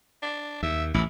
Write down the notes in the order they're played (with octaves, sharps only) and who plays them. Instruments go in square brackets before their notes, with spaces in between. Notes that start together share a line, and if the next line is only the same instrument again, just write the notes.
[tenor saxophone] D4
[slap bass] D#2 [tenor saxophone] E5
[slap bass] A1 [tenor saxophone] E4